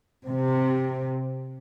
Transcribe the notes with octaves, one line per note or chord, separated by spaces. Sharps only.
C3